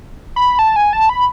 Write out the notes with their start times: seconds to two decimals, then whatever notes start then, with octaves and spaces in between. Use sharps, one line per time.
0.36 B5
0.59 A5
0.76 G#5
0.93 A5
1.09 B5